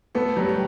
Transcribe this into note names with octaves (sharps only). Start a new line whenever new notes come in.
A3 B3 A4
F#3 G3 G4
G4